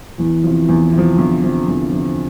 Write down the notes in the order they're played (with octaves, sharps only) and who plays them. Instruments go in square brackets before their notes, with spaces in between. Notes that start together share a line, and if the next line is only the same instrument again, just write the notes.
[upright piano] E2 [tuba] E3
[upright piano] C3 F3
E2
C3 F3
[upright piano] E2 [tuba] D3
[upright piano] C3 F3
E2
C3 F3